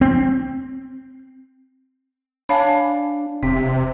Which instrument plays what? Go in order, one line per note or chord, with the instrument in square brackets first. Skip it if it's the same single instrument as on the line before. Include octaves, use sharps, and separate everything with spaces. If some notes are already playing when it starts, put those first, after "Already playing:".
[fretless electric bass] C4
[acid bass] D4 [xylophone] C#5 F5 [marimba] G#5 A5 B5
[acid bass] E1 [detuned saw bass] C3 [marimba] C4 [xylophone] B6